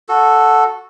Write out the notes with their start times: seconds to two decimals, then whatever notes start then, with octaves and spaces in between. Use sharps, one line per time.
0.09 F#4 A4